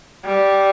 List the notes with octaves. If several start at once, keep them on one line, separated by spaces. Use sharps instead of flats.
G3